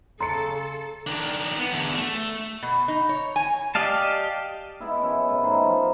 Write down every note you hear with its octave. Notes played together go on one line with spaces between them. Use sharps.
C#3 A4 A#5 C6 C#7
D#3 D4
B3
E2 D3
A3
B2
D#4
C#5
G#5
G4 D5 D#5 F5 A5
G#3 B3 E4
F#2 E4
F#2 A2 G#5
D#3 C5 A#5 C6
F3